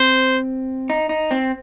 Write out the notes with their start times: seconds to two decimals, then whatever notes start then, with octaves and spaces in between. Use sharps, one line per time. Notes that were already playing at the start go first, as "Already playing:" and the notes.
Already playing: C4 C5
0.90 D#4
1.09 D#4
1.31 C4